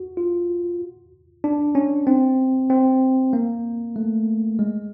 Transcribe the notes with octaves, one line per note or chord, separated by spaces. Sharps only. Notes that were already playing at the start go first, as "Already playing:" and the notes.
Already playing: F#4
F4
D4
C#4
C4
C4
A#3
A3
G#3